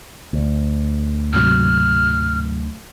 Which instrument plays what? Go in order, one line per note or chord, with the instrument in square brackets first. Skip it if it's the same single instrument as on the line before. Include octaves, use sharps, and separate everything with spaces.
[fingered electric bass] D2
[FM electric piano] G#2 C3 F#3 [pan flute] F6